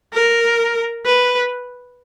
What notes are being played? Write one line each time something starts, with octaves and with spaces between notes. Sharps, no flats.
A#4
B4